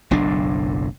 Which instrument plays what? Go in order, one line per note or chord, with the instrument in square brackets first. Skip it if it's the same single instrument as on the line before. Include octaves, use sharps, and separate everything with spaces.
[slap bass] F#1 B1 A2 D4